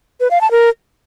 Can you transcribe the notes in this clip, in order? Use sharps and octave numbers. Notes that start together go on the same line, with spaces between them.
B4
F5
A5
A#4